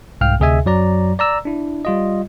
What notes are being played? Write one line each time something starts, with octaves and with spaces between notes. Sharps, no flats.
C2 G#2 F5 G5 F6
D2 C3 G#4 D#5 E5 G#5
F#2 F#3 D5 A#5
D5 A#5 E6
D4 E4
G3 F4 D#5